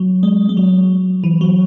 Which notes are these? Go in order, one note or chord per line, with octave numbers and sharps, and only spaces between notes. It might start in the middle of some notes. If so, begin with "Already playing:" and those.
Already playing: F#3
G#3
G#3
F#3
E3
F#3